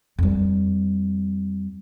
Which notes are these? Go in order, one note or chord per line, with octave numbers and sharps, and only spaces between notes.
F2 G3